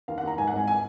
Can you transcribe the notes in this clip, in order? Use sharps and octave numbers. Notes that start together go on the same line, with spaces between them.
D#2 F5
F#5
D#2 A#5
G#2 G#5
F#5
G#1 G#5
G#5